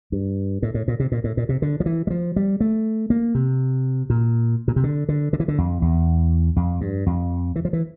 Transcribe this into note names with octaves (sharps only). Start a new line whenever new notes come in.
G2
A2
A2
A#2
C3
A#2
A2
A#2
C3
D3
F3
E3
G3
F3
G3
A3
A#3
C3
A#2
A#2
C3
D3
D3
D3
E3
D3
F2
E2
F2
G2
F2
E3
F3
E3